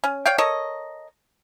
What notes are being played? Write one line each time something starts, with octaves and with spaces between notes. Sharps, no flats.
C#4
C#5 D5 F5 G5
A4 A#4 C#5 D#5